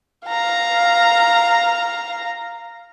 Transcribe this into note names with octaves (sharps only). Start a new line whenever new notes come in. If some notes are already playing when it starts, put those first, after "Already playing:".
F5 A#5